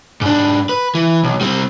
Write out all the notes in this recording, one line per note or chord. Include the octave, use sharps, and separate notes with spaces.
G#2 D4
B4
E3
B1
G3 C4